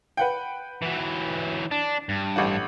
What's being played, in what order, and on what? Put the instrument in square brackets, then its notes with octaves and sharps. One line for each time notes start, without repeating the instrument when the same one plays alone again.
[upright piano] B4 F#5 G5
[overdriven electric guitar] E3 F#3
D4
G2
[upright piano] A1 G4 F#5